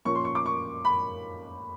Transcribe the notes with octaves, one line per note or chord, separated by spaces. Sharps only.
A#2 F3 A#3 C#4 C#6
C6
C#6
D6
C#6
B5